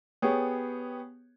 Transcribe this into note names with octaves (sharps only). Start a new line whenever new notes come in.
B3 G4 G#4 C#5